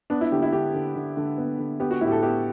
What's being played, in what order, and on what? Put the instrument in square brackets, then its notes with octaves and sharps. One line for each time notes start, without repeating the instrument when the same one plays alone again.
[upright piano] B3 D4
E4
D3 G4
E4
D3 G4
D3
D3
D3
B3
D3
B3 G4
F#4
A2 E4
G4
A4
B3 G4